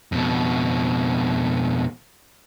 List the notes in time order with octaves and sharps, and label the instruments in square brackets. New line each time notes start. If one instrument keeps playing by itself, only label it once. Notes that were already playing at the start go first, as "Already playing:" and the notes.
[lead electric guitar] F2 B2